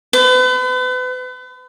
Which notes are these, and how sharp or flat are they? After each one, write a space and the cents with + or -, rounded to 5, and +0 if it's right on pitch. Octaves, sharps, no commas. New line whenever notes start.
B4 +40